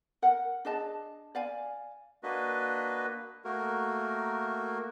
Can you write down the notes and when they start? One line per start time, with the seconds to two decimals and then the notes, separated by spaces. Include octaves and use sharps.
0.22 A#4 F#5
0.65 D4 G#4 D#5 A5
1.35 D5 F5 G#5
2.23 A#3 D4 F#4 B4 D#5
3.44 A3 A#3 F#4 A#4